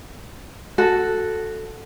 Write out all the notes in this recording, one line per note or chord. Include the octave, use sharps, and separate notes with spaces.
F#4 A4